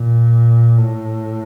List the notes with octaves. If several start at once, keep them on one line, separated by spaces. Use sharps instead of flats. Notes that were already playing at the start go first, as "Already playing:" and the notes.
Already playing: A#2
A2